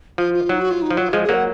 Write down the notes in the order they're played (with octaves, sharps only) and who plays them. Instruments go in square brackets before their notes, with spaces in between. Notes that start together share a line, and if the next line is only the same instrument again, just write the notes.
[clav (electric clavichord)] F3 [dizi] F4
[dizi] F4
[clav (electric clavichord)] F#3 [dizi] D#4
[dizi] F#4
F4
D#4
[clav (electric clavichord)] F3
[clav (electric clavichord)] F#3 [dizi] F4
[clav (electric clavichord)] F3 G#3 [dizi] G#4
[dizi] G#4
[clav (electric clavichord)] F#3 A#3 [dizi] F#5